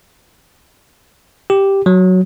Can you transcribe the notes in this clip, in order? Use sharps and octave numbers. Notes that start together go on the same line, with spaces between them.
G4
F#3